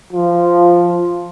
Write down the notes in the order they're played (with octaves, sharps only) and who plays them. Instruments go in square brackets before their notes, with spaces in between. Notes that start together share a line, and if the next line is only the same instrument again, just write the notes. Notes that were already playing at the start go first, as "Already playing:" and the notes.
[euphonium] F3